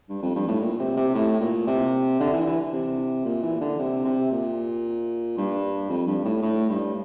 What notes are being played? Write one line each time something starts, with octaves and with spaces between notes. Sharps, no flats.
G2
F2
G2
A2
A#2
C3
C3
A2
A#2
C3
D3
E3
E3
C3
A#2
E3
D3
C3
C3
A#2
G2
F2
G2
A2
A2
G2